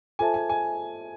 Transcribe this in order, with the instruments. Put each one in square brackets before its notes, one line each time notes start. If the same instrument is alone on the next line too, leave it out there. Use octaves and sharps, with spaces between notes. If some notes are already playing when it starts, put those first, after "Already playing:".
[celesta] F4 A4 C5 E5 A5 [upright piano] G#5
[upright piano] G#5
G#5